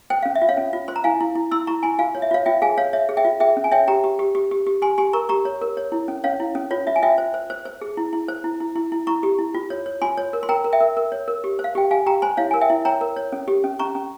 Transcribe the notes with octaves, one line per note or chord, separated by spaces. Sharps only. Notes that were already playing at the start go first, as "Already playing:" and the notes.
C5 G5
C#4 F5
E5
F4
C#5 F5
C#4
F4
C5 C6
A#5
E4 F5 G#5
E4
E4
E4 C6 E6
E4 A#5 C#6
E4 G#5 C6
F4 F5 G#5
C#5
E5
F4 C#5 F5
F4 E5 G5
G#4 F5 G#5
C#5 F5
C#5 E5
G#4
E5 G5
F4
G#4 E5 G5
C#4
G#5
C#5 E5 G5
G4 G5 A#5
G4
G4
G4
G4
G4
G4 G#5 C6
G4 G#5 C6
A#4 A#5 C#6
G4 A#5 C#6
C#5
A#4
C#5
E4
C#4
C#4 C#5 F5
E4
C#4
F4 C#5
F4 E5
G#5
F4 E5 G5
C5
C5
C5
C5
G#4
E4
E4
C5
E4
E4
E4
E4
E4 A#5 C#6
G4
E4
F4
C#5
C#5
F4 G#5 C6
C#5
A#4
C6
A#4 G5 A#5
A#4
E5 G5
A#4
A#4
C#5
A#4
G4
C5
F5
G4 G5
G4 F5 G#5
G4 G5 A#5
C5 G#5 C6
E4 C#5 F5
A#4 G#5
E5 G5
E4
C#5 G5 A#5
A#4
C#5
C#4
G4
C#4
C#4 A#5 C#6
C#4